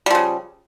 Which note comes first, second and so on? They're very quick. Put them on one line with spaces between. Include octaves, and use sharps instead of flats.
G3 F3 C#3